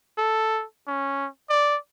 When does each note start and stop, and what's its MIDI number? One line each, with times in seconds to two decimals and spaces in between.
0.17 0.64 69
0.87 1.27 61
1.50 1.77 74